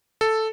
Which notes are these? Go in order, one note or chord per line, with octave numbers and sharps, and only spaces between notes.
A4